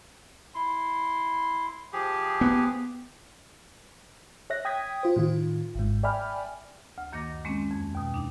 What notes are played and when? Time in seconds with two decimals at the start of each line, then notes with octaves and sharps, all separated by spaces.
0.55 E4 C6
1.93 F3 G4 G#4
2.41 B3
4.50 C#5 E5 F#6 A#6
4.65 G5 D#6 G#6 B6
5.03 F4 C5
5.16 A2 D#3 F4
5.75 G#1 G#2
6.03 D5 E5 G5 G#5 B5 F6
6.98 D2
7.12 F#2 D#3 A#3 D#5 D6 A#6
7.45 D#3 G#3 A#3 C4 C#4
7.71 F2
7.95 D#2 B2
8.14 D4 D#4